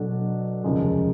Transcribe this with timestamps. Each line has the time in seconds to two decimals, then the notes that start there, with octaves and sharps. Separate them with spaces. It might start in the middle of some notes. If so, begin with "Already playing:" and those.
Already playing: B2 F#3 A3 D4 F#4
0.64 F1 D#2 C#3 F3 G#3